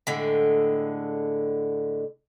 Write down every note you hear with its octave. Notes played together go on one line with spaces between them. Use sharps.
A2 D3 G#3